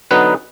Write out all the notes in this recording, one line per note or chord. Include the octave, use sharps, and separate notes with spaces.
D3 F#3 B3 D#4 B4